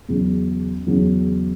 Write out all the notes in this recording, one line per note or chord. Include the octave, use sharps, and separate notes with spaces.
E2 C#3 F#3
E2 C#3 F#3